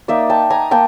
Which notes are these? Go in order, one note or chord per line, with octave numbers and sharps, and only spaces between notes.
A#3 D#4 D5 E5
G5 A5
G#5 A#5
A#3 G5 A5